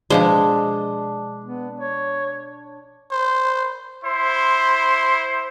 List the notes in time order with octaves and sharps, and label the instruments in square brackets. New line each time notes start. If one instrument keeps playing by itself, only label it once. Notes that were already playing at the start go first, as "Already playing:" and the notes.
[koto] B2 F3 C5 [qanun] G#3 [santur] D4
[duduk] B3
C#5
[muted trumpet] C5
[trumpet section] E4 C5 [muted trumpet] C6